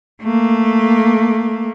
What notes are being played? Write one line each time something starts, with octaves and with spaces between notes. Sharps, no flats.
A3 A#3